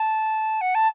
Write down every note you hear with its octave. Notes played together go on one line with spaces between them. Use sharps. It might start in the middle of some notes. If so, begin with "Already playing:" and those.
Already playing: A5
F#5
A5